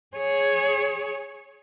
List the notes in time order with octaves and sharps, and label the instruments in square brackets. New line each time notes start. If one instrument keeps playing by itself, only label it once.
[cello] G#4 C#5